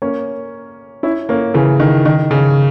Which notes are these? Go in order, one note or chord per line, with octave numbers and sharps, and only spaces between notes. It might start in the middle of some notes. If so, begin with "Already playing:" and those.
A#3 C#4
C#4 E4
A#3 C#4
C#3 E3
D#3
D#3
C#3